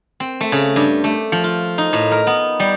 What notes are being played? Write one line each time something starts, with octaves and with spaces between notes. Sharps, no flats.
C4
A3
C#3
G2
A3
F3
F4
D#4
A2
A#4
B3
G3